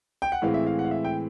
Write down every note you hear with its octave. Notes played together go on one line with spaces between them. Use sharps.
G5
F#5
A2 E3 G#3 C4 F5
E5
F5
F#5
F5
E5
G5